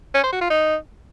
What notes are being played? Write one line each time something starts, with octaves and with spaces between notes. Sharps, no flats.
C#4
C5
F#4
F4
D#4